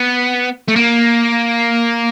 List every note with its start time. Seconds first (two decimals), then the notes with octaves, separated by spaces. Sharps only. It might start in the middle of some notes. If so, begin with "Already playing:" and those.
Already playing: B3
0.68 A3
0.76 A#3